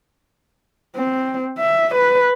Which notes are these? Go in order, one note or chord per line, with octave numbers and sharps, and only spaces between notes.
C4
E5
B4